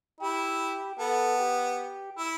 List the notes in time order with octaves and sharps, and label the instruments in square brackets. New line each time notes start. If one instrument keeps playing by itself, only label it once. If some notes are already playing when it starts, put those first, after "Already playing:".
[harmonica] E4 [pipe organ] G4
[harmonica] B3 [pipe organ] A4
[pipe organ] G4
[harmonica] E4